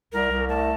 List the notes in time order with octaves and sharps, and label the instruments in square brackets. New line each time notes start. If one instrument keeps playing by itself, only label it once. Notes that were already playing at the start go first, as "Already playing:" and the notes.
[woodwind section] C2 [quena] A#4
[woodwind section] C2
[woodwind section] A3 [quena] A5